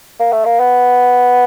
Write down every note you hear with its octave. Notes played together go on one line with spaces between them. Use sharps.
A#3
A3
A#3
B3